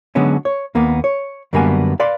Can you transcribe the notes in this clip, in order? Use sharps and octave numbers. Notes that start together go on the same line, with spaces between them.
D3 F#3 G#3 B3 C#4
C#5
D#2 A#3 B3
C#5
F#2 D3 G3 A#3 B3 G#5
B4 D5 F5 C6